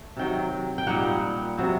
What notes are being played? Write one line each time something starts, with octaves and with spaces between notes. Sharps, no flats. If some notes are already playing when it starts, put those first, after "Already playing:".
Already playing: A3
C3 D#3 F#3 G5
G5
A#2 G3 A#3 D#4 F#5
C3 F#3 C4